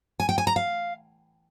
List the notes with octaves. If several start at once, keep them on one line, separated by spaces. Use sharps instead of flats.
G#5
G5
G#5
A#5
F5